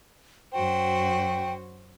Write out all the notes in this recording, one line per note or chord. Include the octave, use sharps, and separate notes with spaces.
F#2 F#4 C5 G5